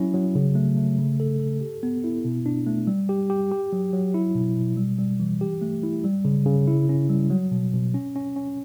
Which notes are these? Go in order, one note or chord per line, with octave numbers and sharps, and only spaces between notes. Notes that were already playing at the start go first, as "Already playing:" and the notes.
Already playing: F#3 C#4 E4
F#3
C#3
A3
A3
C#3
A4
A4
G4
B3
E4
B2
D4
A3
G3
G4
G4
G4
F#3
F#3
E4
B2
B2
G3
G3
E3
G4
A3
E4
G3
C#3
C#3
E4
C#4
G3
F#3
B2
B2
C#4
C#4
C#4